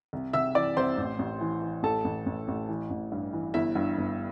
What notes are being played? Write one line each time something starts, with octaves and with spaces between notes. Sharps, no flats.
C2
C3 E5 E6
E3 D5 D6
C2 C5 C6
A1
A1
E3
E3
A1 A4 A5
A1
A1
A1
E3
A1
G2
E3
G1 E4 E5
G2
G1